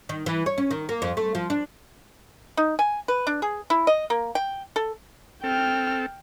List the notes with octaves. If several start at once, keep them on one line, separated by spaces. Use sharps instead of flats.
D#3
E3
C#5
C#4
D#3
A#3
F2
A3
F3
D4
D#4
G#5
B4
D4
G#4
E4
D#5
A#3
G5
A4
C4 A4 G5 F6